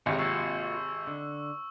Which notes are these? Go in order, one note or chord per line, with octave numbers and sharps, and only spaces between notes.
G#1 C3 G#3 C#4 F#4
A#3 F4 F#4 C#6 E6
D3